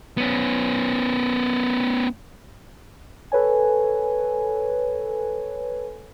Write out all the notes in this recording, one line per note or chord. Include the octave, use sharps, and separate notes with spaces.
B3 C#4
A4 B4 C#5 G#5